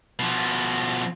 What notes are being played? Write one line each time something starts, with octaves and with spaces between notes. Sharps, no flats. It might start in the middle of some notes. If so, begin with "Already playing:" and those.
B2 F3